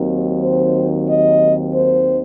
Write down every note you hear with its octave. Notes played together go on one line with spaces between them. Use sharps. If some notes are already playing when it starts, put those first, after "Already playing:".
Already playing: D#2 D#3 F#3 C4
C5
D#5
C5